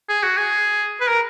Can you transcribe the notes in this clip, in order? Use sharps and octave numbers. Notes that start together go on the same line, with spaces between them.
G#4
F#4
G#4
B4
A#4